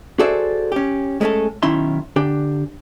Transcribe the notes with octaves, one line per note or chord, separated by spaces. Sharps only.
F#4 G#4 A4 C5 D5 E5
C#4 G4
G#3 A3 C#4 F#4 A4
B1 D#3 C#4 E4 E5 C6
D3 D4 G4